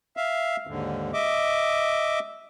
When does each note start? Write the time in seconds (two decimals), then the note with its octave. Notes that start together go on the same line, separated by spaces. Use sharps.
0.17 E5 F5
0.67 D#2 G#2 D3
1.14 D#5 E5 D6